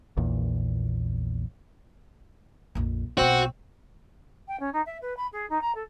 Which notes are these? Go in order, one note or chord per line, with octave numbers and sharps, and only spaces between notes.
A#1 E2 A#2
A#1 F2
B1 C4 F4 F#4
G5
C#4
D#4
E5
B4
B5
G#4
D#4
A#5
A4